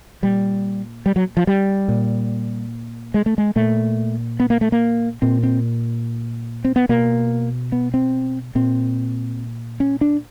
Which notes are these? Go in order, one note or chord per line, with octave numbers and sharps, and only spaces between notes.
A#2 G3
G3
F#3
F3
G3
A#2
G#3
A3
G#3
A#2 A3
B3
A#3
A3
A#3
A#2 C4
C4
C4
B3
B2 A#3
B3
C4
A#2 C4
C#4
D4